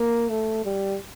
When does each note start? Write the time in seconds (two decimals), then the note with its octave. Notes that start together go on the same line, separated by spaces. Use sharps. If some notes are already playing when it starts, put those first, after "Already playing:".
Already playing: A#3
0.29 A3
0.65 G3